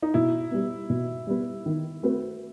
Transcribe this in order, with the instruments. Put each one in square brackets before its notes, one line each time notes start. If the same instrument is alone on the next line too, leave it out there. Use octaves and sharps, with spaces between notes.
[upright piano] D#4
[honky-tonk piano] B2 [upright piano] E4
[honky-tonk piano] G3 B3
B2
G3 B3
D#3
A3 C4 F#4 B4